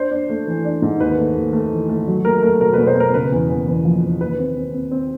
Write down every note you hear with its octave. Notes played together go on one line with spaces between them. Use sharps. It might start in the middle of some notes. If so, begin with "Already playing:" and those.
Already playing: D4 C5
D4
A3
E3
D4
G#2
D#2 B4
A3
D#2
A3
E3
A3
F#3
A3 A#4
A3 A#4
B2 A#4
B2 B4
C5
B2 A#4
C#3 B4
E2
E2
E2
F3
E2
D#2 B4
C4
C4
C4
C4